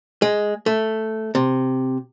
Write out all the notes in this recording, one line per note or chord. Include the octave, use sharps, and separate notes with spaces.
G#3
A3
C3